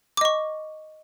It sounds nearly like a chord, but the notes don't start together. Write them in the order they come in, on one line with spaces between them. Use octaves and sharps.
D6 D#5 C#6